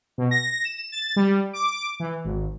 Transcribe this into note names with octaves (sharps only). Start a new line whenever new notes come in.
B2
A#6
E7
A6
G3
D6
E3
G#1